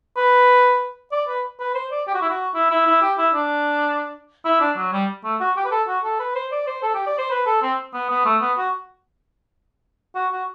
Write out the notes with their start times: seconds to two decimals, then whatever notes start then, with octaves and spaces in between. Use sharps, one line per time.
0.17 B4
1.12 D5
1.28 B4
1.60 B4
1.75 C5
1.91 D5
2.07 G4
2.14 F#4
2.22 E4
2.29 F#4
2.55 E4
2.71 E4
2.87 E4
3.02 G4
3.18 E4
3.34 D4
4.45 E4
4.60 D4
4.77 F#3
4.93 G3
5.24 A3
5.40 F#4
5.57 G4
5.65 B4
5.71 A4
5.88 F#4
6.04 A4
6.20 B4
6.35 C5
6.52 D5
6.67 C5
6.83 A4
6.94 G4
7.07 D5
7.18 C5
7.30 B4
7.46 A4
7.62 C4
7.94 B3
8.10 B3
8.25 A3
8.41 B3
8.58 F#4
10.15 F#4
10.32 F#4